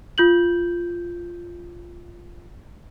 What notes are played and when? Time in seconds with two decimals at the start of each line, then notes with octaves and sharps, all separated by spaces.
0.18 F4 G6 F#7